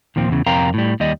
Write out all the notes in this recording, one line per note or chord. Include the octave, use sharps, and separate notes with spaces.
D#2 A#2 F3 C4
E2 C#3
F2 C3 A#4 F5 G5 A#5
A2 G3
D#2 G3 D#5